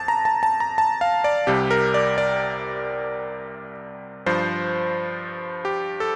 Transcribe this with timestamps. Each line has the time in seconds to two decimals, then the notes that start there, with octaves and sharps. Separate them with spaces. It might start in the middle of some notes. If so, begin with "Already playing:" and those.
Already playing: F2 A5
0.08 A#5
0.25 A5
0.43 A5
0.60 A#5
0.78 A5
1.01 F5
1.24 D5
1.47 C2 C3 G3 G4
1.71 A#4
1.94 D5
2.18 D5
4.26 G2 F3 C5
5.65 G4
6.00 A4